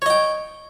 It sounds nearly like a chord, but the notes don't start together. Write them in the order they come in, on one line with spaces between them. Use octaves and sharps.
C#5 D#5 G5